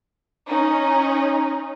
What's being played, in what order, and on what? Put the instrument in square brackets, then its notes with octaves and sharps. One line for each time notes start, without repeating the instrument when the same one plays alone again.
[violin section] C#4 D#4